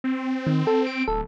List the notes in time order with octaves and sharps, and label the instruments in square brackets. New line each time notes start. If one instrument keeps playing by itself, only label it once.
[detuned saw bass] C4
[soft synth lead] D#3
A4
D7
[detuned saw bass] D1 [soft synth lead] A4